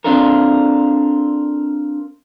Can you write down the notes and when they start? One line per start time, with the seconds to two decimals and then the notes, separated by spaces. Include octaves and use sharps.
0.04 C4 D4 F4 A4 A#4